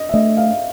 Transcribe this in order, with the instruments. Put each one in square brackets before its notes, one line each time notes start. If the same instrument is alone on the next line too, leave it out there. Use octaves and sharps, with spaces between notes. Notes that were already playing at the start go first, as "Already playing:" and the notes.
Already playing: [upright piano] D#5
E5
[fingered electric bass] A3 D4 [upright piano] D#5
[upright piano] F5